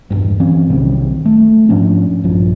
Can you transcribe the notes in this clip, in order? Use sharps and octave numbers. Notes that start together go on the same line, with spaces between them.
E1 G2
E3 C4 C#4
B1 C3 D#3 G3
A3
G#2 F3 C#4 D4
A#1 G2 F3